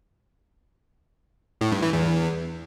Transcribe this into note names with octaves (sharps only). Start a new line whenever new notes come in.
A2
G2
E3
E2